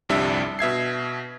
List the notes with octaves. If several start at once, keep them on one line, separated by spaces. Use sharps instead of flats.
G1 C2 F2 G3 D4 E5
B2 E5 G#6 C7